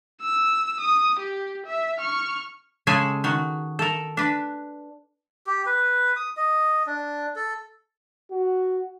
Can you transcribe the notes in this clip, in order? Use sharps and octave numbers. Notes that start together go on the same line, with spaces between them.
E6
D#6
G4
E5
C#6 F6
C#3 G#3 G#4 A4 G#5
D#3 F#4
A4 A#4
D4 B4
G4
B4
D#6
D#5
D4
A4
F#4